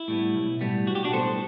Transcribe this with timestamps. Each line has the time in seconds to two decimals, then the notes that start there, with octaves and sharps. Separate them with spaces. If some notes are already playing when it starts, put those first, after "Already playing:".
Already playing: E4
0.08 A2 G3 B3
0.34 B1
0.61 A2 G3 B3
0.87 B1 F#4
0.95 G4
1.04 D4 F#4
1.13 A2 G3 B3 A4 C5